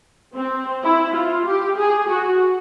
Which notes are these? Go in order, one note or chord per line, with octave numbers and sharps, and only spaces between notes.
C4
E4
F4
G4
G#4
F#4